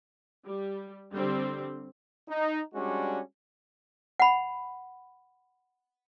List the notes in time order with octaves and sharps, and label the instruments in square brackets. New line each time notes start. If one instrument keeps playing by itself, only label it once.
[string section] G3
D3 G3 C4
[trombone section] D#4
G3 G#3 C#4 D4 F#4
[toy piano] F#5 B5